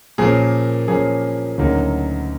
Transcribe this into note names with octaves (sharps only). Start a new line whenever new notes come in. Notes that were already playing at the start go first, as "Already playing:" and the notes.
A#2 F3 A#3 C#4 G#4
A#2 F3 A#3 C#4 G#4
D2 C#3 F#3 A#3 D#4